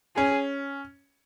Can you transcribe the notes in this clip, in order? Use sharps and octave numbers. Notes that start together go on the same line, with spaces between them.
C#4 G#4